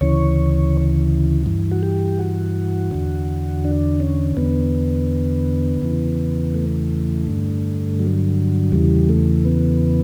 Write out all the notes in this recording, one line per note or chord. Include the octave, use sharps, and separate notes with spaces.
D2 C#3 E3 C#5
G2 E3
F#4
G4
F#4
E2 D3
D4
C#4
E2 D3 B3
E2 C#3 E3
A3
G2 D3
F#3
E2 C#3 E3 G3
A3
B3